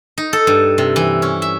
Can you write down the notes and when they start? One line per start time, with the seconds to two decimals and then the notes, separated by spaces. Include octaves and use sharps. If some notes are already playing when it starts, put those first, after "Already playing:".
0.18 D#4
0.33 A4
0.47 G2
0.78 C3
0.96 E3
1.22 C#4
1.42 E5